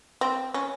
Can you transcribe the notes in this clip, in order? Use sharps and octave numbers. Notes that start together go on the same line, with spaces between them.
C4
C#4